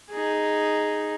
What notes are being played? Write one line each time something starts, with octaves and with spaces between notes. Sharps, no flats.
D#4 G#4